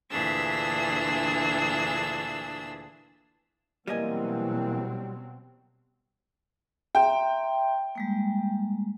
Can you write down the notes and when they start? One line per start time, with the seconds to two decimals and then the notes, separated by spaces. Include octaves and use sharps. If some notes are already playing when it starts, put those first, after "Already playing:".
0.11 D2 A#2 E3 D4 G#4 E6
3.87 B2 E3 F#3 G3 A#3 C4 D#5 G#5
6.95 E5 G5 A#5 C6
7.95 G3 G#3 A#3